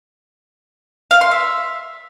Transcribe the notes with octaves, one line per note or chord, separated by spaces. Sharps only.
F5
C6
E5